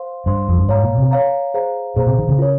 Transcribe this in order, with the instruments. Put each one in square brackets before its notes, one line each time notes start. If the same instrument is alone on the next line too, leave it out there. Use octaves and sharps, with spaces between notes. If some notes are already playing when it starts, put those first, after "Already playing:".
Already playing: [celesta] C5 F5 C6
[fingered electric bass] G2 [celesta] C5 F5 C6
[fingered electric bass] F2
G2
[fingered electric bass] G#2 [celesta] C#5 F5 A#5
[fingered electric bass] A#2
C3
[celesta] C#5 F5 A#5
G#4 C5 F5 A#5
[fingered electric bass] A#2 [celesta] G#4 C5 F5 A#5
[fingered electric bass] C3
D#3
C#3
[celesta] F4 A#4 C#5